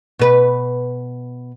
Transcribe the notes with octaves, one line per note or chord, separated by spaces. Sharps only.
B2 B4